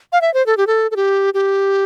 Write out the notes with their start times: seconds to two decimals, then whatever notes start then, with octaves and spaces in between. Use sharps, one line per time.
0.12 F5
0.21 E5
0.34 C5
0.46 A4
0.57 G4
0.67 A4
0.91 A4
0.96 G4
1.34 G4